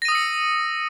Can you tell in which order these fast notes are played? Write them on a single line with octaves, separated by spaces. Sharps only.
A#6 D#7 D#6 E6 C#7